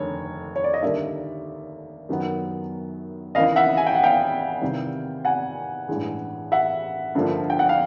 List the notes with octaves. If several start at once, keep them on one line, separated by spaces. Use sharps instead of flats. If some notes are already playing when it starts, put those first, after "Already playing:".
Already playing: F1 D#2 D3 C#5
C#5
D5
D#5
D#2 D3 G3 A#3 D5 E5
F#2 D#3 F#3 B3
D#2 C#3 E3 D#5 F5
E5 F#5
G#5
G5
F#5
F5 G5
E2 C3 D#3 G3
F#5 G#5
A1 G2 E3 G#3
E5 F#5
G2 D3 F3 A#3
G5
F#5
F5